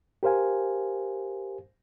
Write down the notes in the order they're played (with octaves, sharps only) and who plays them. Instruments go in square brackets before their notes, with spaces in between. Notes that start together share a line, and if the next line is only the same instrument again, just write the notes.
[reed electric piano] G4 A#4 C5 F5 G#5